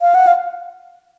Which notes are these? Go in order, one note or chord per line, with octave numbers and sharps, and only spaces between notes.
F5
F#5
F5